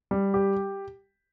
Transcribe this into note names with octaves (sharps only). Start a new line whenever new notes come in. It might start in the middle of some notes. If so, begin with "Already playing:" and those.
G3
G4